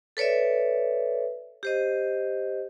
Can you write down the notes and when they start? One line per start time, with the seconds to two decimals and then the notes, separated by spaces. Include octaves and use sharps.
0.17 A4 B4 C#5 D5 E5
1.63 G4 C5 D#5